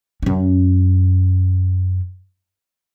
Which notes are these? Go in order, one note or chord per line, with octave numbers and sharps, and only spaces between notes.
F#2 C#4